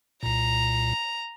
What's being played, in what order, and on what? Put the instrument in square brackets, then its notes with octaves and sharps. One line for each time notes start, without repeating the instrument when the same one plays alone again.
[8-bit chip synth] C2 A#2 [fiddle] A#5